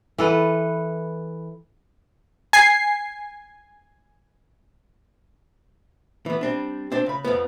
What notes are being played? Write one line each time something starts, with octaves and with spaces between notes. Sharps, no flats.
E3 A4 B4
G#5 C7
E3 B3
G3 C4 D4
C4 D4 C5 D5
C#3 B5
F2 F3 B3